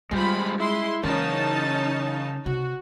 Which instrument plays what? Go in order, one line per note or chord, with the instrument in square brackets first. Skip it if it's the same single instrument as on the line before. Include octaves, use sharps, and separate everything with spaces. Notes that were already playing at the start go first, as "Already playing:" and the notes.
[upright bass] G3 C#4 [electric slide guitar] G#3 G4 C5 [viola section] F4 B5
[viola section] G#3 C6 [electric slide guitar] E4
[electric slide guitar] C#3 A#4 [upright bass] E3 [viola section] C#4 D#4 A5
[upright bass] C3 [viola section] F#4